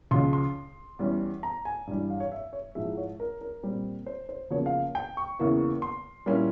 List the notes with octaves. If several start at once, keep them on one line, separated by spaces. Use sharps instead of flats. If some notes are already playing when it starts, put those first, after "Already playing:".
C#2 C#3 F3 C6
C6
E2 E3 G3 C#4
A#5
G#5
G2 E3 G3
F5
C#5
E5
C#5
G#2 F3 G#3 E4 E5
C#5
A#4
A#4
A#2 G3 C4
C5
C5
E2 C#3 F3 A#3 C#5
F5
G5
C#6
E2 C#3 E3 A#3 E4
C6
A#2 G3 A#3 C#4 E4